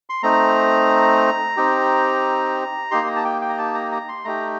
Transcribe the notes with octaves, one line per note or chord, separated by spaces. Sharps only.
C6
A3 C4 D#4 A#5
C4 D#4 G4
A#3 D#4 G4 C6
A#5
A5
G5
G5
A#5
A5
A#5
A#5
C6
A3 D#4 G4 A#5